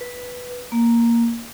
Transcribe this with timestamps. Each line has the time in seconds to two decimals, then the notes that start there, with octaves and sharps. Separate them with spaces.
0.01 B4
0.72 A#3